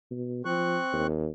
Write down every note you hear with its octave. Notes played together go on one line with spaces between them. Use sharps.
B2
F3 C4 C#6 F#6
D#2